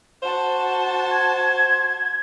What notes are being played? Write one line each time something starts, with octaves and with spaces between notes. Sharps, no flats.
F#4 C5 A5
G#6